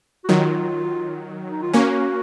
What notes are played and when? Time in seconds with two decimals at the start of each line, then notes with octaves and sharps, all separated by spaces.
0.24 F#4
0.29 D#3 F#3 F4
1.51 D#4
1.62 F4
1.73 A#3 C#4 F#4